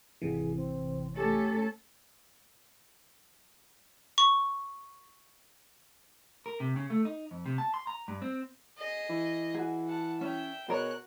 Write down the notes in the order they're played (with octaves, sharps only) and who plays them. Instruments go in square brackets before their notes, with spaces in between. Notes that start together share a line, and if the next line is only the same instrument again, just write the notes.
[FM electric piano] G#1 C3 E3 [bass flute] G#4
[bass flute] C4
[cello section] A3 C#4 A4 [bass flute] G4
[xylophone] C#6
[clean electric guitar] A#4
C3
C#3
A3
D#4
F2
C3
A5
C6
A#5
G2
C4
[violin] G#4 D#5
[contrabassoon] E3
[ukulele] F#4 G#4
[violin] F#5 A5
[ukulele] C#4 [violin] E5 G5
[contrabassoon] B2 [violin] F#4 F#6 [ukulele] G#4 A#4 C#5